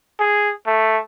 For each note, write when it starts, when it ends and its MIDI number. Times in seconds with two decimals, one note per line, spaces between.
0.20 0.51 68
0.67 0.99 57